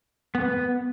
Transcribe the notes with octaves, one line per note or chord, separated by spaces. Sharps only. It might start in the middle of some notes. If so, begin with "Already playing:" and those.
B3